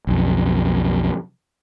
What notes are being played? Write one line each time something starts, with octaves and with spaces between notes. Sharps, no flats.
B1 F2